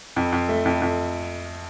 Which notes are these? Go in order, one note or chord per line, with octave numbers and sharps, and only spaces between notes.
F2
F2
A3
F2
F2